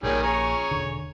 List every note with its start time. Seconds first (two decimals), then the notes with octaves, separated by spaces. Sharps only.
0.03 A#1 A#2 D#3 G3 G#4 A#4 C#5
0.23 G#4 C#5 A#5 C#6
0.71 E1 D3